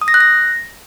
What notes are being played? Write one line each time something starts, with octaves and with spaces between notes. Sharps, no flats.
D#6
A#6
F#6
A#6